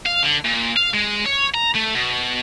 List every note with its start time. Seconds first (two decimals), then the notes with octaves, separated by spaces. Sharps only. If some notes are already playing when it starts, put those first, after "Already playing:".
0.06 F5
0.23 D3
0.45 A#2
0.76 F5
0.94 G#3
1.26 C#5
1.55 A#5
1.75 A3
1.95 B2